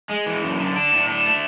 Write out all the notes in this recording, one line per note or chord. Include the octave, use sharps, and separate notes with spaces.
G#3
E3
F#2
D3
D4
A2
D4
A3